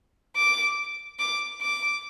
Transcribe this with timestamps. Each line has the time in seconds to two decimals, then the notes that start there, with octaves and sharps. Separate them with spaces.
0.36 D6
1.19 D6
1.62 D6